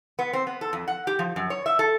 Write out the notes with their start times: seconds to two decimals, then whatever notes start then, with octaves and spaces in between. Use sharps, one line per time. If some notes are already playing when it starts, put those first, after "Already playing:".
0.19 B3
0.33 C4
0.47 B3
0.61 A4
0.73 F2
0.88 F#5
1.07 G4
1.19 F3
1.36 F#2
1.50 C#5
1.66 E5
1.79 A4